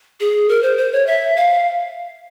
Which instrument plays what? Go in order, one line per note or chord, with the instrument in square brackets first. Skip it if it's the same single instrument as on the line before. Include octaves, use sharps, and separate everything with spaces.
[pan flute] G#4
A#4
C5
C5
C#5
E5
F5